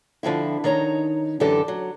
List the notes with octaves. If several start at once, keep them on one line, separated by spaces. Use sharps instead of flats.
D3 F3 C4 E4
D#3 D#4 C#5 A#5
F#2 D3 E3 G4 A4
F#3